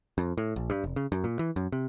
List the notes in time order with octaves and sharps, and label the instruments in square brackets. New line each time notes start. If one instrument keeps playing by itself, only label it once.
[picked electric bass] F2
A2
A#1
G2
F1
C#3
F#2
A#2
E3
F#2
C3